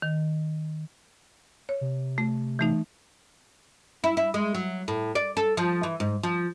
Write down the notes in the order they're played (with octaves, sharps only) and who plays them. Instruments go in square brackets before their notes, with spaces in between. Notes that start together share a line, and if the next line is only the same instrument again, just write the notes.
[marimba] D#3
C#5
[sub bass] C3
[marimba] A3
E3 A3 D#4
[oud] E4
E4
G#3
F#3
A2
D5
A4
F3
E3
G#2
F3